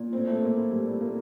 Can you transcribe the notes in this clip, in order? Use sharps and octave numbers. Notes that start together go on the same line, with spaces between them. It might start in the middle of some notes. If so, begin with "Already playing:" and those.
Already playing: A#2
A2 C4
A3
A2 A#3
C4
A2 G3
A2 A#3